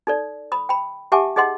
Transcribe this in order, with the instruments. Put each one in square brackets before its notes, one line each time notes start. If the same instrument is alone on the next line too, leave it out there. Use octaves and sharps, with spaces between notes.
[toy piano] D#4 A4 D5
B5 D#6
G5 B5
G4 E5 F#5 G#5 A5 D6
D#4 G#4 D#5 F#5 C6